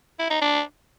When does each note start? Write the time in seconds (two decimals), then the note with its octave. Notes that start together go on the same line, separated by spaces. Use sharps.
0.19 E4
0.30 D#4
0.41 D4